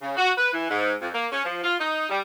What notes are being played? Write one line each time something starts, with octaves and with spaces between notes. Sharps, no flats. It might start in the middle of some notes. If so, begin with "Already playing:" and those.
C#3
F#4
B4
E3
G#2
F2
A#3
C#4
F3
F4
D#4
G3